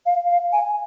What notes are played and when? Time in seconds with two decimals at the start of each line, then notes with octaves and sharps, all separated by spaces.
0.06 F5
0.30 F5
0.53 G#5